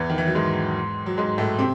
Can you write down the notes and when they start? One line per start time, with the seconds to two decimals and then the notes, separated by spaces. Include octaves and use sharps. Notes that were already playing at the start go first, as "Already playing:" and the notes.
Already playing: E2 E3
0.10 D#3
0.18 E3
0.27 F#3
0.35 G#2 G#3
1.06 F#3
1.18 G#2 G#3
1.38 A2 A3
1.59 C3 C4